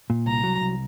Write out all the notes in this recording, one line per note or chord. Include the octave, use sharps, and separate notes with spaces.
A#2
C2 A#5
F#3
C2